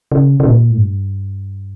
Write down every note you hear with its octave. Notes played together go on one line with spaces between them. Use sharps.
C#3
C#3
A#2
A2
G2